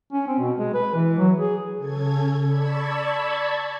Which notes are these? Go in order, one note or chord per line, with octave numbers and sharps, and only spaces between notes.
C#4
C4
B2
G#3
B4
E3
F#3
G#4
C#3 C#4 A4 G#6
D5 A5 B5 C#6 E6 G#6